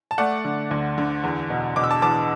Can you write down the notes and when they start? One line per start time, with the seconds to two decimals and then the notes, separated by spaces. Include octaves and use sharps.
0.11 A5
0.18 A3 D5 F#5
0.45 D3
0.71 D2
0.98 D3
1.24 E2
1.50 B2
1.76 B2 D6
1.84 E6
1.91 A5 D6
2.02 E2 A5 D6